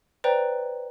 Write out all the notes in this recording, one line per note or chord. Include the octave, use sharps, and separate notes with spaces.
B4 C5 D5 G5 A#5 F#6